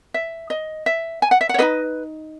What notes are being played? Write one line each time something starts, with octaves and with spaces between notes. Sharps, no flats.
E5
D#5
E5
G#5
F#5
E5
F#5
C#5
D#4 G#4 B4 D#5